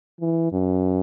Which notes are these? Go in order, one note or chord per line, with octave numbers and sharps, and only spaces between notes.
E3
F#2